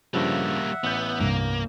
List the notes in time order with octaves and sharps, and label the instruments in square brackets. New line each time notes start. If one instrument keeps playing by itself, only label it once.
[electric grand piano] G2 C#3 F3 [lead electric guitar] G3 A#3 [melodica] E5 F#5
[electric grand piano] A1 G6 [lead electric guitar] B3
[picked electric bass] C2 G2 [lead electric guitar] A#3